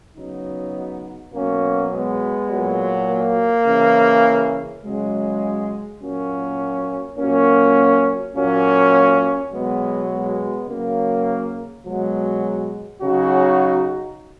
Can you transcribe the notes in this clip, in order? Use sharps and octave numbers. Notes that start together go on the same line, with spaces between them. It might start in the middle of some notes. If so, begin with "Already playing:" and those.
C#3 F#3 B3 D#4
B2 F#3 A#3 C#4
G#3 B3
A#2 F#3
A#3
C#3 E3
C#3 F#3 G#3
A#2 F#3 A#3 C#4
A#2 F#3 A#3 C#4
A#2 F#3 A#3 C#4
B2 F#3 G#3 B3
G#3 B3
C#3 F#3 A#3
B2 F#3 G#3
C#3 F#3 D#4 F#4